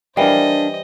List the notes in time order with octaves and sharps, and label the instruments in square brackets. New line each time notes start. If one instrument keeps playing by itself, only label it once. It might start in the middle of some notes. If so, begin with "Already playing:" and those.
[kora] E3 G3 [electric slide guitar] D4 A#4 F5 [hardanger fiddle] C5 D#5